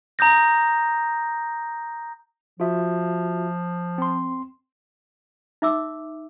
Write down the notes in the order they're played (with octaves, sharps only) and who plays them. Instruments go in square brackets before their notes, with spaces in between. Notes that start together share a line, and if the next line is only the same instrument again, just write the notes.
[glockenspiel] A#5 D#6 G6 A#6
[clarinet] F3 [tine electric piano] F4 F#4 E5
[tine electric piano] C4 C6
[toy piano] D#4 E5 D6 E6